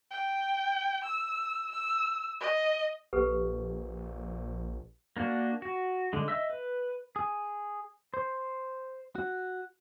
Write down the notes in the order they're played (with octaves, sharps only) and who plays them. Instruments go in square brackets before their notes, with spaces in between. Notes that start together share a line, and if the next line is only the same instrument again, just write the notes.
[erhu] G5
E6
E6
D#5
[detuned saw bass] A#1 [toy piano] G4 A4 B4
[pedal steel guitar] A#3 D4 F#4
F#4
D3 G#3
D#5 E5 E6
B4
[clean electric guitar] G#4
C5
F#4